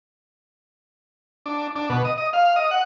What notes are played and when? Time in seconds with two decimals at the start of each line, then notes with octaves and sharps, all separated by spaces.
1.46 D4
1.76 D4
1.90 B2
2.05 D#5
2.18 D#5
2.33 F5
2.56 D#5
2.71 F#5